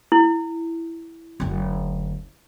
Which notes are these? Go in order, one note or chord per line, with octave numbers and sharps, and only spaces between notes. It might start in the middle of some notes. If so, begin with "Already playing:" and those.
E4
F#1 D2